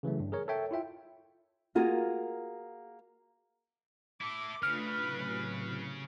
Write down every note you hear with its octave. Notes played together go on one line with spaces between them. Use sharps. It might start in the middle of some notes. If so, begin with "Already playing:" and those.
C#3 E3 F#3 A3
G2
G#4 A#4 C#5
A4 A#4 C#5 E5 G5
E4 F4 E5 G5
A#3 F4 F#4 G#4 A#4
E4 A4 D6
C#3 A3 D4 F4 B4 F6
A2 C3 F#3